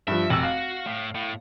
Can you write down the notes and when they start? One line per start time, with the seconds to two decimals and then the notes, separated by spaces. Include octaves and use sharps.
0.08 G2 F3 E5
0.30 F1 F#4 E6
0.43 F5
0.86 A2
1.15 A2